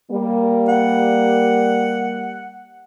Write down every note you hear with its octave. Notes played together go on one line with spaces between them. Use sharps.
G3 A#3
F#5